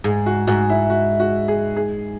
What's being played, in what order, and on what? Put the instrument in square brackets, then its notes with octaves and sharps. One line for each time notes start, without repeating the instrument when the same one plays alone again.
[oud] G#2 [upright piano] G#4
[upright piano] F#4
[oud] G#2 [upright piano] F#4
[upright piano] E4
F#4
F#4
G#4
G#4